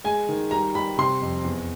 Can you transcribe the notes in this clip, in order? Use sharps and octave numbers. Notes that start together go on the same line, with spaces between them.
G#3 G#5
D#3
G3 A#5
G3 B5
C3 C6
F2
E2